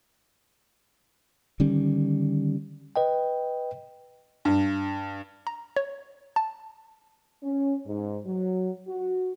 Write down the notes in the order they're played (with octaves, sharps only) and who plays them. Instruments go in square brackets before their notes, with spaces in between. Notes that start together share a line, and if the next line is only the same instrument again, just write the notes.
[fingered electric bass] D3 D#3 G3 C#4
[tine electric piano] B4 D#5 G5
[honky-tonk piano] G2
[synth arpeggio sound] A#5
C#5
A5
[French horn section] C#4
G#2
F#3
F#4